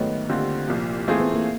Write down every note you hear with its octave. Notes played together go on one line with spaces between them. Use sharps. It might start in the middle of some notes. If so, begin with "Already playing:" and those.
Already playing: G#2 D#3 F#3 A3 B3
D#2 D3 G3 C4 F4
C2 A#2 F3
E3 A3 A#3 C4 F4 G#4
B3
A#3